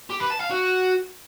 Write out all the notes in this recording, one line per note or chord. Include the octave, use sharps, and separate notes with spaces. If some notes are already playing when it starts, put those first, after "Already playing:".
G4
B4
A5
F5
F#4